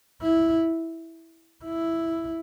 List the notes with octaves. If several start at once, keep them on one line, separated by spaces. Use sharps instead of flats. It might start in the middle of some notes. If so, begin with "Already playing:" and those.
E4
E4